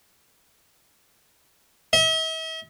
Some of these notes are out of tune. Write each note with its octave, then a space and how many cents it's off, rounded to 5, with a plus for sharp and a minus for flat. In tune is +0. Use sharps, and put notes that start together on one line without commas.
E5 -45